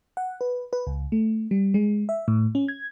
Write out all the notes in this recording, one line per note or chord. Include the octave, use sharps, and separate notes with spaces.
F#5
B4
B4
C#2
A3
G3
G#3
E5
A2
C#4
G#6